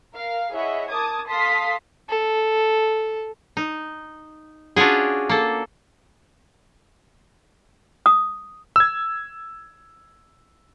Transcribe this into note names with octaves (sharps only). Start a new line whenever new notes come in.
A#4 F5
E4 G#4 C#5 D#5 E5 F#5
A#4 A5 D6 D#6 G#6
A4 F5 A5 C6 D#6 B6
A4
D#4
C#4 D4 F4 F#4 G#4
A#3 A4
D#6
E6 G#6